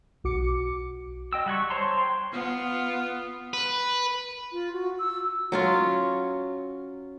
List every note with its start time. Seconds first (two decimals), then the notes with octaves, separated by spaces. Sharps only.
0.24 B1 F#4 D6 C#7
1.33 D#5 G5 E6
1.46 G3 F#5 G#5 C#6
1.70 C5 C#5 A5 A#5 C6
1.98 G5 C6
2.32 B3 F4
3.54 B4
4.52 F4
4.73 F#4
4.99 E6
5.52 F#3 C#4 F4